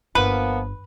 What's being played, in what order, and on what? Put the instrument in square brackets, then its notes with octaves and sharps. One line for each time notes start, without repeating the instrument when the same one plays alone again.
[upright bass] G1 [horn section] F3 A#3 B3 [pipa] B4